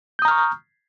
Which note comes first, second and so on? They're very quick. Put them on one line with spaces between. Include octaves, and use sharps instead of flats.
G6 D#6 A#5 F6 C#6